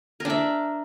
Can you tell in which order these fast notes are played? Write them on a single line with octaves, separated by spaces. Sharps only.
A#4 D4 E5